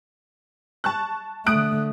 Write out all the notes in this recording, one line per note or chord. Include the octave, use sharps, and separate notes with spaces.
A5 C#6 F#6
D3 A3 D#6 F#6 D7